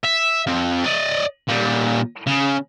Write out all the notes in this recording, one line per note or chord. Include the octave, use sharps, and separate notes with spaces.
E5
F3 C4
D5 D#5
A#2 G3
C#3